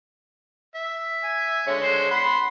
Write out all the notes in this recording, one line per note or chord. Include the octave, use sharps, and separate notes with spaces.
E5
G#5
D3 G#3 C#5
C5
F#5 B5 C6